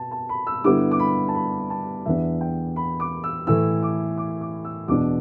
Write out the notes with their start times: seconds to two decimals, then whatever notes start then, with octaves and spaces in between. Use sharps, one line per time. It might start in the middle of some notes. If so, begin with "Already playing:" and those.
Already playing: B2 B3 A5
0.11 A5
0.29 B5
0.47 E6
0.64 G2 D3 G3 B3 E4 D6
0.91 D6
1.00 B5
1.28 A5
1.35 B5
1.70 A5
2.06 E2 E3 B3 D4 E5
2.41 G5
2.76 B5
3.00 D6
3.24 E6
3.47 A2 E3 A3 E4 E6
3.83 D6
4.18 D6
4.41 D6
4.65 E6
4.88 E2 B2 B3 D4 D6